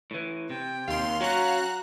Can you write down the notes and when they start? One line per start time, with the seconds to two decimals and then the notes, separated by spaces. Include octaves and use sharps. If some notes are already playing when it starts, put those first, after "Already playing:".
0.11 A2 E3
0.50 C3 G5
0.88 D#2 F5 C6
1.20 F#3 C#4 F#4 A#5 F#6